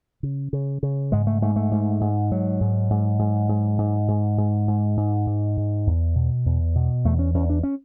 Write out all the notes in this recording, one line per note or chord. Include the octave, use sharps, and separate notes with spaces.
C#3
C#3
C#3
G#2 G#3
A3
G#2 A3
A3
G#2
G#2
G#2 F#3
G#2
G#2
G#2
G#2
G#2
G#2
G#2
G#2
G#2
G#2
G#2
E2
B2
E2
B2
E2 A3
C#4
E2 C#4
D4
C#4